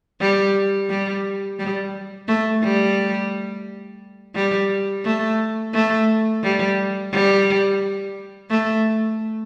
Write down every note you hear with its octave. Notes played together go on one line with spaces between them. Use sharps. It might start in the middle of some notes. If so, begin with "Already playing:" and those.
G3
G3
G3
A3
G3
G3
A3
A3
G3
G3
A3